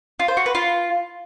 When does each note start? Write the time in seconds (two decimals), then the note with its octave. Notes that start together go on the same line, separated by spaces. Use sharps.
0.19 F4
0.28 C5
0.37 F#4
0.46 B4
0.55 F4